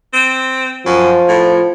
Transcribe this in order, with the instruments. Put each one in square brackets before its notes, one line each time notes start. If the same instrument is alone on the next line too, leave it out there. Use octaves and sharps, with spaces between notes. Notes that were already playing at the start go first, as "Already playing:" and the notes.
[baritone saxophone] C4
[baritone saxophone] F#2 [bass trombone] F3
[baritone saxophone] A2